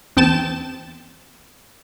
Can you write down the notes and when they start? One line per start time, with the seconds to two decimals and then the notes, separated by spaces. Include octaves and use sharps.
0.17 E2 C4 G5 A5 E7